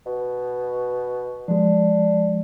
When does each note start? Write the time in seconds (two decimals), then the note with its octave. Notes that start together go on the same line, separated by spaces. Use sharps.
0.06 B2
1.48 F3 G#3 D4